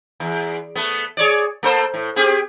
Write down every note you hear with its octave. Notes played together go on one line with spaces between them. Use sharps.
E2
A3 B3
G#4 C#5 D5
A#3 A4 C5
A2
C4 G4 G#4